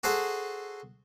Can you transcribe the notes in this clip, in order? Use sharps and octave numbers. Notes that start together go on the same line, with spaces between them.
F#4 G#4 A4 C5 F#5